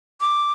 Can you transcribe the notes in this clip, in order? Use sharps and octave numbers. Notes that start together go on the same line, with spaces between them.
D6